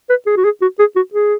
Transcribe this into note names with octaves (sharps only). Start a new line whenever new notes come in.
B4
G#4
F#4
G#4
F#4
G#4
F#4
G#4